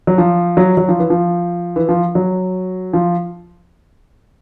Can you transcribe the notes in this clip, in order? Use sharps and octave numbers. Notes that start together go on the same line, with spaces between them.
F#3
F3
F#3
F#3
F3
E3
F3
E3
F3
F#3
F3